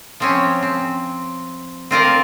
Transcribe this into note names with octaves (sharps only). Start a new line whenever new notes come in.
F3 C4 C#4
C4
C4 F4 A#4 D5